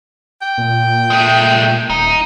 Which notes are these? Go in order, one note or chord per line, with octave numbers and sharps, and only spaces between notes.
G5
A#2
G#3 A3
D#1 D#4